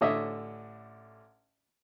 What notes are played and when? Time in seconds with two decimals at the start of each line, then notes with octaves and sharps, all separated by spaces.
0.01 A1 D3 C#5 D#5 E5